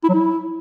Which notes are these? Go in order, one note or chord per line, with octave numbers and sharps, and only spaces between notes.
E4
F#3
E4